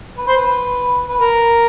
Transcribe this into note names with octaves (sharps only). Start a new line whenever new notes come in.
B4
C5
B4
B4
A#4